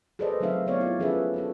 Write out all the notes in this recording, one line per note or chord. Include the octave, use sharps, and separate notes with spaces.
G#4 A4 B4 C5 D5 D#5
F#3 A3 C4 D#4 E5 F5
B3 C4 C#5 D5 F5
E4 F4 D5
F3 C#4 G#4 A4 B4 E5
D4 F#4 A4